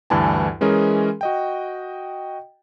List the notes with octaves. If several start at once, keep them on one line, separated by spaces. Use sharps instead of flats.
D2 G2 E3 E4 G#5 A5
E3 G#3 C#4 G#4 A#4
F#4 D#5 G5